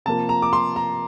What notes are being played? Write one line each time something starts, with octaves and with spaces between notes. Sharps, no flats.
C3 F3 A#3 A5
A#5
D6
C6
A#5